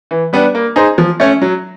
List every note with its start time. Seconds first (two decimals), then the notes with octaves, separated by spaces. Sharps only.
0.11 E3
0.33 G3 B3 D4
0.55 A#3
0.76 D#4 G#4 C5
0.98 F3
1.20 A3 C#4
1.42 F#3